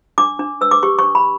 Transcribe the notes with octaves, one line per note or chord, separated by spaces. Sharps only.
D4 D6
D4
B4 E6
D6
G4 C#6
D4 C#6
B5